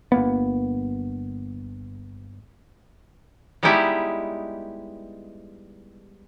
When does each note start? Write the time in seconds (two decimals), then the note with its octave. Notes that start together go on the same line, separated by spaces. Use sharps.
0.12 G1 A#3 B3
3.63 G3 G#3 B3 D#4 E4 G4